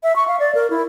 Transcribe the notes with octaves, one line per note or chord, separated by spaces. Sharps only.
E5
C#6
F5
D5
A#4
E4